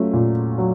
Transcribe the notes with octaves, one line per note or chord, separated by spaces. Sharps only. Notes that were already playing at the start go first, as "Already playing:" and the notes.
Already playing: F#3 A3 C#4 F4
A#2
F#3